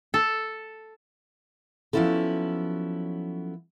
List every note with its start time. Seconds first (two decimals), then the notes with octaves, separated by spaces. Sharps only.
0.14 A4
1.93 F3 F#3 B3 C#4 E4 A4